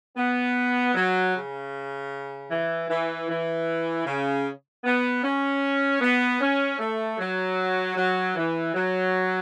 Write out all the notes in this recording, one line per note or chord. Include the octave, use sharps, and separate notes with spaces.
B3
F#3
C#3
E3
E3
E3
C#3
B3
C#4
B3
C#4
A3
F#3
F#3
E3
F#3